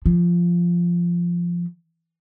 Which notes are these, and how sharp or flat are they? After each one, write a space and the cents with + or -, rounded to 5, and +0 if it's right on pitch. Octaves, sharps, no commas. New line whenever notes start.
F3 -10